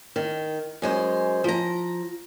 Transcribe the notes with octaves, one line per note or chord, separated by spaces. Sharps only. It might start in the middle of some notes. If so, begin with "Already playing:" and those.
D#3
F#2 G#3 C5
F3 A#5